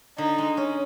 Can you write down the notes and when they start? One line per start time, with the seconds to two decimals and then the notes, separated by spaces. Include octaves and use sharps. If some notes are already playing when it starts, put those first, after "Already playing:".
0.18 D3 D#4
0.38 G#3
0.57 C#4